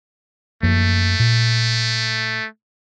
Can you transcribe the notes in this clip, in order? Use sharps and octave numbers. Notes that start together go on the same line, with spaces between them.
F#2 F3 A3 A#3
A#2